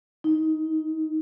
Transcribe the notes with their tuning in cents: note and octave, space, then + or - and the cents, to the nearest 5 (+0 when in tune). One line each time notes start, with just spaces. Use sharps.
D#4 +15